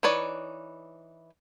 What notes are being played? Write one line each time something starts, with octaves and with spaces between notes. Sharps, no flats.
E3 D#4 B4 C#5 D5